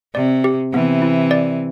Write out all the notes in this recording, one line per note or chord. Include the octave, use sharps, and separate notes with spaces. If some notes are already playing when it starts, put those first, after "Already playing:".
C3 D5
G4
C3 E3 B3
E4
D5